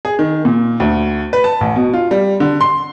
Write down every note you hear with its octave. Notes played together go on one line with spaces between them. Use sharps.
G#4
D#3
A#2
D2
B4
A5
A1
B2
F4
G3
D3
C6